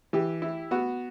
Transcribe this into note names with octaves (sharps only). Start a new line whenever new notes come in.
E3 G4
E4
B3 F#4